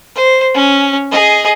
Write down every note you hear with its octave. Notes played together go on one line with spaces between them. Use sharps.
C5
C#4
G#4 D#5